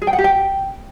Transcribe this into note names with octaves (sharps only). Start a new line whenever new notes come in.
G#4
G5
F#5
G4
G5